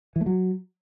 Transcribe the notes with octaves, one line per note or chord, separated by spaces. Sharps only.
E3
A3
F#3